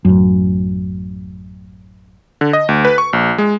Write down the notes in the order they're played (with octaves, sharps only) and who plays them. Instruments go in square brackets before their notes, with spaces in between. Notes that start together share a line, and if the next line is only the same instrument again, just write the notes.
[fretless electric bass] A1 F#2
[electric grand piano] D3
D#5
D2
B4
C#6
A#1
G#3